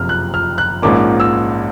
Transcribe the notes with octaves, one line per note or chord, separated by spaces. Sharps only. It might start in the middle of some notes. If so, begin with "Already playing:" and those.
Already playing: F#1 F2 C3 F6
F#6
F6
F#6
A#1 G#2 F3 A#3 C#4 D6
E6